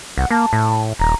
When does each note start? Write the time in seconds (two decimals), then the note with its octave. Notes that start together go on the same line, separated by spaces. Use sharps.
0.17 C2 F#5
0.31 A#3 A5
0.53 A2
0.99 D#1 A#5